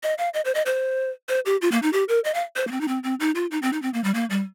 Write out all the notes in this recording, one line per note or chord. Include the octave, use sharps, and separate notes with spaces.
D#5
F5
D#5
C5
D#5
C5
C5
G4
F4
A#3
D#4
G4
A#4
D#5
F5
C5
A#3
C4
D#4
C4
C4
D#4
F4
D#4
C4
D#4
C4
A#3
G3
A#3
G3